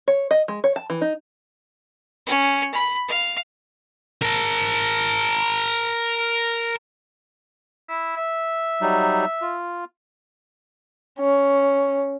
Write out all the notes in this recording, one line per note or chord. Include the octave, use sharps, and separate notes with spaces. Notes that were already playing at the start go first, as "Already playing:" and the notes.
C#5
D#5
G#3
C#5
A5
E3
D#4
C#4
B5
F5
A#4 A5
E4
E5
F#3 G3 D#4
F4
C#4